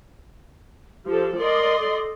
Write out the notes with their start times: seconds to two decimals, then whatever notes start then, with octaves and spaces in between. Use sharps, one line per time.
1.06 F3 G4 A4
1.38 A#4 D5 D#5 C6
1.80 A4